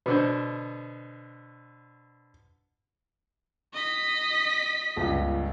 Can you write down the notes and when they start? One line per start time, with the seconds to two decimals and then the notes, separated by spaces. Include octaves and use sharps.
0.06 B2 D3 C5
3.74 D#5 B6
4.96 G1 C#2